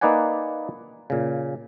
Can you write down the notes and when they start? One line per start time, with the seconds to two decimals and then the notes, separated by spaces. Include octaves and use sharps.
0.01 A#3 D#4 B4 D5 F#5 G#5
1.10 A#2 C#3